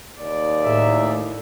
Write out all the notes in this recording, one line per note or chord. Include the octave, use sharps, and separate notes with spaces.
D#2 D5
A2 G#4 A#4 E5